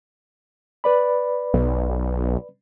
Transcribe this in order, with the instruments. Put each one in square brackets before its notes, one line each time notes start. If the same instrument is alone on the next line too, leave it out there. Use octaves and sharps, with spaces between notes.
[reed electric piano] B4 D5 B5
[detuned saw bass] B1